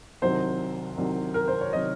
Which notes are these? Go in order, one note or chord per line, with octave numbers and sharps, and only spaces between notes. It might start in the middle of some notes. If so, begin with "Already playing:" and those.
C2 C3 D#3 F#3 C5
C2 C3 D#3 F#3
A#4
C5
C#5
C3 D#3 F#3 D#5